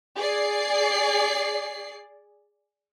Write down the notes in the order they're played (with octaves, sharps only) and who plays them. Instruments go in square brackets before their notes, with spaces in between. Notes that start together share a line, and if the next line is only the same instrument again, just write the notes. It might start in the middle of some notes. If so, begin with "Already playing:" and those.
[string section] G#4 D5 C7